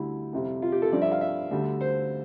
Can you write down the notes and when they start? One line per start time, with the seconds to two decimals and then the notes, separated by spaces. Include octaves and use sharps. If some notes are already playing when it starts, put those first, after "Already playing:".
Already playing: D2 D3 G3 E4
0.33 F2 C3 G3
0.62 F4
0.72 G4
0.82 A4
0.92 G2 F3 D5
1.02 E5
1.12 F5
1.21 E5
1.51 D2 D3 G3
1.81 C5